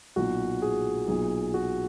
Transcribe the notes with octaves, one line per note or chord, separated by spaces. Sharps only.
B1 A#2 F#4
G#4
B1 A#2 G#4
F#4